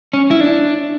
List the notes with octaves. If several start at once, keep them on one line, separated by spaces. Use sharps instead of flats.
C#4
E4
D4